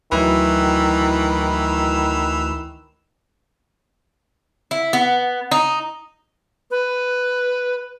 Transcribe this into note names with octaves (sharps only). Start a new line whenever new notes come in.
D2 D#3 E3 F#3 E4 B4
E4
B3
D#4
B4